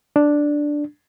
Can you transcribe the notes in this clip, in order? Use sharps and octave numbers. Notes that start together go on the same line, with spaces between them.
D4